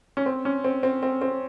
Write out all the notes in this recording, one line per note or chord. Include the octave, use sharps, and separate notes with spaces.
C#4
C4
C#4
C4
C4
C4
C4